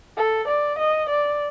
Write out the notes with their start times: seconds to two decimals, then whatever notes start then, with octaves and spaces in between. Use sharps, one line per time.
0.17 A4
0.48 D5
0.79 D#5
1.10 D5